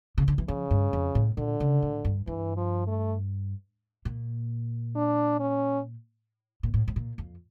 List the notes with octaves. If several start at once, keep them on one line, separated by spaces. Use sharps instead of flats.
C#3
D3
E3
C#3 F3
G2
F2
A2
A#2 D3
C#3
A2
G2
G2 E3
F3
A3
A#2
D4
C#4
A#2
A2
A2
A#2
F2